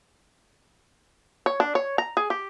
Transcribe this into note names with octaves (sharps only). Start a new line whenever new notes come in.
C#5
D4
C#5
A#5
G#4
G4